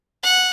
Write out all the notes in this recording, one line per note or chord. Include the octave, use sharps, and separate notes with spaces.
F#5